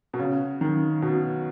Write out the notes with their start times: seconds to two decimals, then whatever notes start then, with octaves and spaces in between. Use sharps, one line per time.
0.13 B2
0.19 C#3
0.61 D#3
1.02 B2